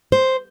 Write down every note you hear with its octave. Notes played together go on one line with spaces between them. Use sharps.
C5